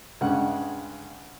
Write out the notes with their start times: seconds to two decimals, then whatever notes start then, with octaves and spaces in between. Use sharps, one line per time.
0.21 G2 C#3 G#3 F#5